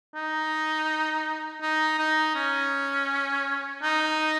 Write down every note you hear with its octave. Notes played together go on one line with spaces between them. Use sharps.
D#4
D#4
D#4
C#4
D#4